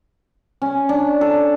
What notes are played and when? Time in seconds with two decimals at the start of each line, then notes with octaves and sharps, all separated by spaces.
0.62 C#4
0.89 D4
1.21 A4